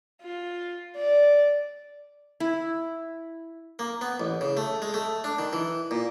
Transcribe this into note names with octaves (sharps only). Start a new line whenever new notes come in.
F4
D5
E4
A#3
B3
A1
C#3
A3
G#3
A3
D4
D#3
E3
A#2